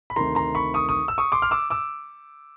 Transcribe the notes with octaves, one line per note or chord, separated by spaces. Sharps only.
B5
D2 C3 D#3 A#5 C6
A#5 C6
B5 C#6
C#6 D#6
C#6 D#6
E6
C#6 D#6
C6 D6
F6
D6 E6
D6 E6